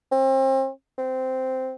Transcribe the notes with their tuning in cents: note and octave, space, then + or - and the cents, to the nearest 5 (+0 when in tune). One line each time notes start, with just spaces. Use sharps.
C4 +35
C4 -10